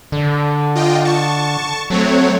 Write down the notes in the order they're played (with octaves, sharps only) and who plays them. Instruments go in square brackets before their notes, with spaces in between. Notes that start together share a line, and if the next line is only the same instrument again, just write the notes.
[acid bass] D3
[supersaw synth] F4 D#5 G5
A5 C#6
[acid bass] F#3 [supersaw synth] A3 C4 C#5